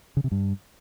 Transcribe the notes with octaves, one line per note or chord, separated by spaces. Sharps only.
C#3
C3
G2